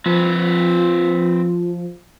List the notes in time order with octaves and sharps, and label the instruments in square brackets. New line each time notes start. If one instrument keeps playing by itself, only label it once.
[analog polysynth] F3 [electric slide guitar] C4 B4 [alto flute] F4